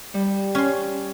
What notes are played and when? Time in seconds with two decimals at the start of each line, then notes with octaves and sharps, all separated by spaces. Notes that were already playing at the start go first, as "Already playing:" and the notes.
0.14 G3
0.55 C#4 C6